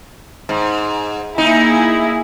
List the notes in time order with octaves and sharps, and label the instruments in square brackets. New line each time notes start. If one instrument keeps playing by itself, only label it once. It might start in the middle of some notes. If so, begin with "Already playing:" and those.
[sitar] G#2
[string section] A#3 E4 G#4 [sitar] D#4